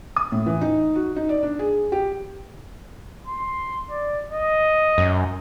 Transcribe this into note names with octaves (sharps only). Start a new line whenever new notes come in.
D#6
A2
E3
D#4
F#4
D#4
D5
D4
G#4
G4
C6
D5
D#5
F#2